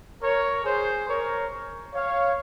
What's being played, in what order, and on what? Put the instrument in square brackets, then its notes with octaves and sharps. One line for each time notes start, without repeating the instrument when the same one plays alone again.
[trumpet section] A#4 C#5
G#4 C5
A#4 C#5
C#5 F5